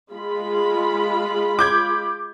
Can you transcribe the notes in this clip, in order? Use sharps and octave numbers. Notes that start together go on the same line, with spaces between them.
G#3 F4 B5
D6 G6 G#6